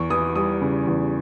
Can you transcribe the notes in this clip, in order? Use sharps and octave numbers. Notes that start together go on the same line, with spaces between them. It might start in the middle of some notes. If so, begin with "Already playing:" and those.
Already playing: E2 C#6
E3 D#6
G3 D#6
C#3
E2